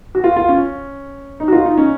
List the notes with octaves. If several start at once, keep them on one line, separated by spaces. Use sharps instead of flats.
F#4
F4
F4
C#4
D#4
F#4
F4
D#4
C#4